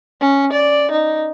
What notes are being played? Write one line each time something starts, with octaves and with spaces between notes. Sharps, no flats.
C#4
D5
D#4